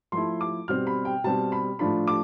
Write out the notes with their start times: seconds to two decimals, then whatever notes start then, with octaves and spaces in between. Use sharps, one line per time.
0.12 F3 A3 E4 C6
0.41 D6
0.68 B2 G3 C4 F6
0.87 B5
1.05 G5
1.24 B2 G3 C4 A5
1.52 B5
1.79 A2 F3 A3 D4 F4 B5
2.08 D6